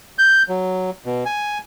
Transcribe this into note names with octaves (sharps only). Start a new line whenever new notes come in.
G6
F#3
B2
G#5